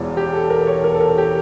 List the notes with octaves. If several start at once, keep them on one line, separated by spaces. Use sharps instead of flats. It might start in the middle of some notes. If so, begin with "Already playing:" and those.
Already playing: E1 E2 E3 F4
G4
A4
A#4
C#5
A#4
A4
A#4
G4